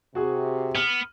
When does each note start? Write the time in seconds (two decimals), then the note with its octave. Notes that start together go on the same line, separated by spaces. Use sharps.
0.15 C3 F#4 G#4
0.75 B3 F6